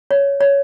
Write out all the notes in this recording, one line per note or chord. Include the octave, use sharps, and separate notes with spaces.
C#5
C#5